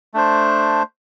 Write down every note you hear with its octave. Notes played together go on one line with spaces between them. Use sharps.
A3 D4 C5